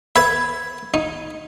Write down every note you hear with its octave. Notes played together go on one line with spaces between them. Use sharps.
B4 E5 B5 G#6
D#4